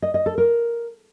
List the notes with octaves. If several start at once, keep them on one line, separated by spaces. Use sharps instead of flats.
D#5
D#5
A4
A#4